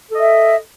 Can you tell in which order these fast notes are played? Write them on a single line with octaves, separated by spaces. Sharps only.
A4 D#5 E5